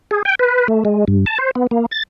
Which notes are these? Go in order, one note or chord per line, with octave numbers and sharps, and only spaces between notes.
G#4
G5
B4
A3
G#3
G2
A5
C5
B3
A#3
A6